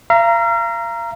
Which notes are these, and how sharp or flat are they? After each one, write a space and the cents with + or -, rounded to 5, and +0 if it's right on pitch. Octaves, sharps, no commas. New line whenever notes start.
F5 -40 A#5 +0